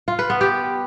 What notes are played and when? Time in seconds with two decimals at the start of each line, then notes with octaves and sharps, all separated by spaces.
0.08 F4
0.19 B4
0.30 B3
0.41 G4